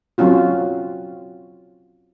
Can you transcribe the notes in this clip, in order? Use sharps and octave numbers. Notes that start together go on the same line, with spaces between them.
F#3 C4 C#4 F4 F#4